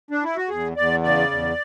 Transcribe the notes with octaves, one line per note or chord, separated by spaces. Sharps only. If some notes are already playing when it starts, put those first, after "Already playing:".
D4
E4
F#4
E2 G#4
E2 D5
C#3 D5
E2